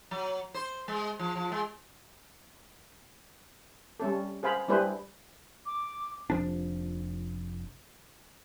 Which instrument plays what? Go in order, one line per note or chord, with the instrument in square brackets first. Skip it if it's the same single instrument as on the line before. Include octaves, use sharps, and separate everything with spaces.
[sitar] F#3
C5
G#3
F3
F3
G#3
[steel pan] G3 C#4 A4
G#4 C5 F5 B5
G3 D4 E4 G#4 B4 C5
[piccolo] D6
[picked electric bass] F1 F3 D4